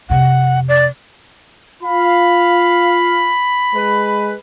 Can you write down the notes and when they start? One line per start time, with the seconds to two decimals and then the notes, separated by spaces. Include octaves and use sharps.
0.10 F2 C3 F#5
0.68 D5
1.83 F4 F5 B5
3.74 G#3 B4